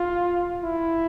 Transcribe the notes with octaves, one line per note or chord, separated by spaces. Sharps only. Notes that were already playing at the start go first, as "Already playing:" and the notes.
Already playing: F4
E4